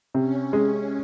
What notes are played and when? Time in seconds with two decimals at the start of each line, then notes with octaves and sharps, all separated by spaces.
0.14 C3 C#4
0.53 G#3